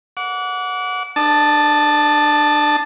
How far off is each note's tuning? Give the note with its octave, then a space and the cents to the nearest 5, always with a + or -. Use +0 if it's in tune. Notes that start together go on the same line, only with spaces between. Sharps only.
F#5 -15 D6 -35
D4 +30 A5 +0 D#6 +0